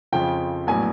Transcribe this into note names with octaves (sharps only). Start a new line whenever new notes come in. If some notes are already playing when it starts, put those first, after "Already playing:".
F2 C#3 F3 G5
A#1 A2 F#3 B3 G#5